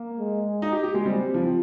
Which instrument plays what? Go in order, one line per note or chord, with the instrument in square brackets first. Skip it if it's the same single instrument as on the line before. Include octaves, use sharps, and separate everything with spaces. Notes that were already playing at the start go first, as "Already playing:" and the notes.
Already playing: [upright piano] A#3
[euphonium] G#3
[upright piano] D#4
G4
G4
G#3
[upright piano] G3 [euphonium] C4
[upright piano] F3